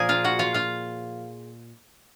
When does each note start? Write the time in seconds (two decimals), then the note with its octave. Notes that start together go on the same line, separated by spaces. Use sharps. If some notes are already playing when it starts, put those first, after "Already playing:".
Already playing: A#2 F3 A#3 G#4 A#4 G#5
0.09 F4 F5
0.24 F#4 F#5
0.39 F4 F5
0.54 F4 F5